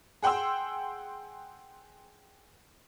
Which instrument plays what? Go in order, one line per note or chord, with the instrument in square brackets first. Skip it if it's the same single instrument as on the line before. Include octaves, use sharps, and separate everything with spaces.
[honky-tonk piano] G#4 F#5 G5 C6 E6